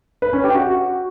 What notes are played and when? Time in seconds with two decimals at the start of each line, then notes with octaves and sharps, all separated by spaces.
0.22 B4
0.33 C#4
0.44 G4
0.55 F#4